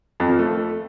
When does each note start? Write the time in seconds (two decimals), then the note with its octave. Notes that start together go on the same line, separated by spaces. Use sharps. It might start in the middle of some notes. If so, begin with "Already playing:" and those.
0.20 F2
0.29 F3
0.39 A3